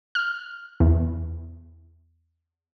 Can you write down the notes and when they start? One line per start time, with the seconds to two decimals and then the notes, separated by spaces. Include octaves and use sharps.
0.15 F6
0.80 E2